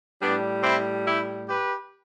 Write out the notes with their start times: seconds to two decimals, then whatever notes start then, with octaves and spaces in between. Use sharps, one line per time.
0.22 A2 G3 B3 D4
0.64 C4 E4
1.06 E4 G4
1.48 G4 B4